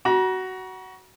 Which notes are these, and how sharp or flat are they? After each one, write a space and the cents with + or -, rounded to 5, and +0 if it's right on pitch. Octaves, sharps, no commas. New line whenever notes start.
F#4 +15 A#5 +45